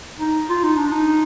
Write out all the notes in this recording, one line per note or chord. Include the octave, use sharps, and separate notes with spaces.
D#4
F4
D#4
D4
D#4